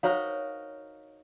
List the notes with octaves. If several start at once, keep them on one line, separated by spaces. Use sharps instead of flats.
D#4 F#4 A#4 C5 C#5 F5